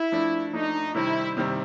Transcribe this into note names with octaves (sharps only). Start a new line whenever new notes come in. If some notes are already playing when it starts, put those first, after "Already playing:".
Already playing: E4
F3 A3 D4
F3 A3 D4 D#4
C3 D#3 G3 C4 E4
C3 D#3 G3 C4